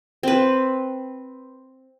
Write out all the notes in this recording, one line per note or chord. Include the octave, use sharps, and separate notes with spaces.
C4 B4